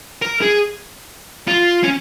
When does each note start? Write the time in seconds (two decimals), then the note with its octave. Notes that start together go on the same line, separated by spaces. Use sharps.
0.22 A#4
0.42 G#4
1.48 F4
1.83 C#4